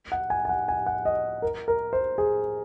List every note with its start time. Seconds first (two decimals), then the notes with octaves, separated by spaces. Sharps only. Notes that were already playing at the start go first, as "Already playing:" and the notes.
0.12 F#5
0.30 G#5
0.45 G#5
0.49 F#5
0.68 G#5
0.86 F#5
1.05 D#5
1.42 A#4
1.68 A#4
1.93 C5
2.18 G#4